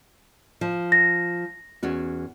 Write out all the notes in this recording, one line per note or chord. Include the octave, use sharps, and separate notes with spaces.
F3
A#6
E2 C#4 F#4